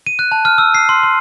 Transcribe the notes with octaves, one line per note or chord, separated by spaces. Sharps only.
D#7
F#6
A5
F6
E6
C7
C6
C6